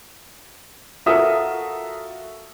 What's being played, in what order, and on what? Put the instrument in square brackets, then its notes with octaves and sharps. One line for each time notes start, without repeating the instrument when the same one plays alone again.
[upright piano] F4 A4 A#4 [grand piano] F#4 E5 D#6